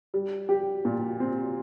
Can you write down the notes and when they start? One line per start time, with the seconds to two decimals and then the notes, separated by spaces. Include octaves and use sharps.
0.14 G3
0.49 G4
0.85 A#2
1.20 C4